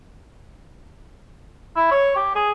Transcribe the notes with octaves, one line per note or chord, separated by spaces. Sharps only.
E4
C#5
G4
G#4